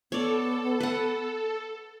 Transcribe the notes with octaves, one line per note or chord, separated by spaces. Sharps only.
B3 A4 C#5 D5
B4 F#5